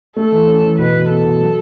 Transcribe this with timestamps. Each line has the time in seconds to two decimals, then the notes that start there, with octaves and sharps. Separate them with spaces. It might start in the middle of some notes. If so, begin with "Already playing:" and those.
0.16 A3 A4
0.32 E3
0.48 C#4
0.64 E3
0.78 B2 B4
0.94 B2
1.09 B3 A4
1.25 B2
1.41 F#3